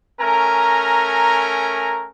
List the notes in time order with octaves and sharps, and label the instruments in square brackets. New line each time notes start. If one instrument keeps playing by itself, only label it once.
[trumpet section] A3 C#4 A#4 G#5 A#5